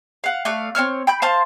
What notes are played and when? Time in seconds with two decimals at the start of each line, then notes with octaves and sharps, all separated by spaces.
0.24 F5 F#5
0.45 A3 D5 F5 F#6
0.75 C4 C5 C#5 F6
1.07 G5 B5 G6
1.22 C5 F5 A5 C6